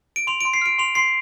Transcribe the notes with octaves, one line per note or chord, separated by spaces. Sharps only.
D7
C6 F7
C6 D7
C7
F6 D7
C6 F7
C6 C7